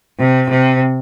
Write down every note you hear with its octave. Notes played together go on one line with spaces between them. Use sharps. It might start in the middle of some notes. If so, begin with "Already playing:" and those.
C3
C3